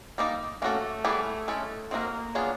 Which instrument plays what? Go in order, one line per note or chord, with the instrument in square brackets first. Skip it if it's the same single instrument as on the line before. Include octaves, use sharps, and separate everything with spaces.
[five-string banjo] G3 A#3 D#4
[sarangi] A3 [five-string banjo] A#3 C#4 F#4 A4
[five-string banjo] E3 G3 B3 E4 G#4
G#3 C#4 E4 A4
[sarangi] A#3 [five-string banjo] C4 D#4 F#4 A#4
[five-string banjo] F#3 B3 D4 F4 G#4